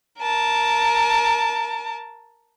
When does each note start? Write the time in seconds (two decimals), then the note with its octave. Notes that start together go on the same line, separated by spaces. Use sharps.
0.19 A#4 A5